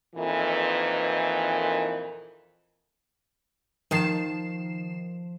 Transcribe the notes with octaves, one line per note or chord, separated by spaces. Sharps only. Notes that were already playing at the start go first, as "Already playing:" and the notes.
F2 A#2 D#3 E3
D#3 F3 A5 C7 E7